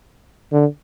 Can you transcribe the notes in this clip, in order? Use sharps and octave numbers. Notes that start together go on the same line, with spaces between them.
D3